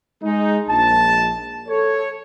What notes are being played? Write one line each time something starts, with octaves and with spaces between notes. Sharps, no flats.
G#3 D#4
A#1 A5
A4 C#5